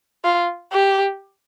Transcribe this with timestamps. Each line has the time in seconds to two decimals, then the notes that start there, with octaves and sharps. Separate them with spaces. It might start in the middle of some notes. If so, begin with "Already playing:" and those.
0.24 F4
0.73 G4